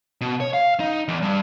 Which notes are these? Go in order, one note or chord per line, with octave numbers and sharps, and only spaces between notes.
B2
C#5
F5
D#4
E2
G2